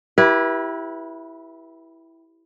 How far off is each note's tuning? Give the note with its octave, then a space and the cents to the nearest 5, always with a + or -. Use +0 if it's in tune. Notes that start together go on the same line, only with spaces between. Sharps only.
E4 +0 G4 -10 B4 -35